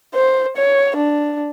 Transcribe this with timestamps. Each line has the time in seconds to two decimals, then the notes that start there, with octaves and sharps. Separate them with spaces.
0.14 C5
0.56 C#5
0.96 D4